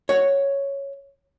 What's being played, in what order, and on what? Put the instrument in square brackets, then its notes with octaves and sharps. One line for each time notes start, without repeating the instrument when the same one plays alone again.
[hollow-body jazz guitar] C#5 F#5